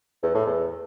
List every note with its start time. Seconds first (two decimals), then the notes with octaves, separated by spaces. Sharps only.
0.22 E2
0.34 A2
0.46 E2